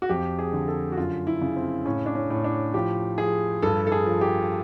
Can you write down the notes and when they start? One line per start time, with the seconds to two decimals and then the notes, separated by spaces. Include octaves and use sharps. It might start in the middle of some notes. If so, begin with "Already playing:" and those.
0.02 F#4
0.09 F2 G4
0.39 G#4
0.53 D3
0.68 A4
0.92 F#4
0.97 F#2 F4
1.27 E4
1.41 C#3
1.56 C4
1.85 A2 C#4
2.06 D4
2.15 C#4
2.30 A2
2.44 D4
2.74 F3 G4
3.18 F3 G#4
3.62 G2 A4
3.87 A4
3.92 G#4
4.06 F3
4.21 G4